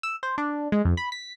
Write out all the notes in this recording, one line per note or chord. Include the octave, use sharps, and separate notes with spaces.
E6
C5
D4
G#3
F2
B5
B6